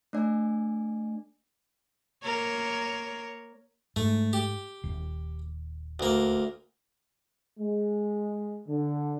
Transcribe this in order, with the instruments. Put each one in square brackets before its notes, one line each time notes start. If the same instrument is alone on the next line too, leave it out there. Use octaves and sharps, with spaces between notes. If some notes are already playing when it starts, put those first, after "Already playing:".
[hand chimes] A3 D4 D5 G#5
[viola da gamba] A#3 A#4 C#5
[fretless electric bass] G#2 [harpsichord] A3
[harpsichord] G4
[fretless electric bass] D#1
[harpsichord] D2 A#3
[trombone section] G#3
D3